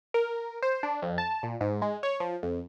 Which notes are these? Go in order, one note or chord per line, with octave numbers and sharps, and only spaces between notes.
A#4
C5
D4
F2
A5
A#2
G#2
G#3
C#5
F3
F2